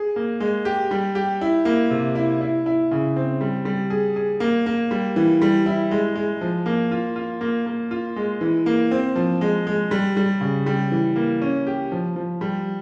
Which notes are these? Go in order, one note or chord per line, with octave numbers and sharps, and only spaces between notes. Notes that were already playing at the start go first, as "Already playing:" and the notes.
Already playing: G#4
A#3
G#3
G4
G3
G4
E4
A#3
C3
E4
E4
E4
C#3
C4
G3
G3
G#4
G#4
A#3
A#3
G3
E3
G3
E4
G#3
G#3
F3
A#3
F4
F4
A#3
A#3
F4
G#3
E3
A#3
C4
F3
G#3
G#3
G3
G3
C#3
G3
E3
A#3
C#4
G4
F3
F3
G3